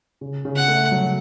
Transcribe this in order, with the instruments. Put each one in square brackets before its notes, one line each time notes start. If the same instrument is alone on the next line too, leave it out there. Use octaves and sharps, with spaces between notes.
[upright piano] C#3
C#3
[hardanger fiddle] F#5
[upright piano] A3
F#3